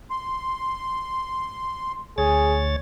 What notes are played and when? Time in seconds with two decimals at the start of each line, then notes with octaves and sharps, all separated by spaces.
0.10 C6
2.18 D2 G#4 C#5 A6